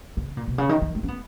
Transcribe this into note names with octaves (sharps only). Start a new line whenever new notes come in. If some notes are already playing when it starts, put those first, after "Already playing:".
C#3
A#2
B2
C#3
D#3
D#3
G#3
C#4
B3